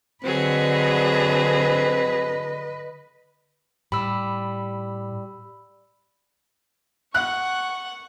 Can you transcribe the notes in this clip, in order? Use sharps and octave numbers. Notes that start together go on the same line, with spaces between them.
D3 F#3 C4 G#4 B4 D#5
A2 G3 B5 E6
F#5 C#6 F#6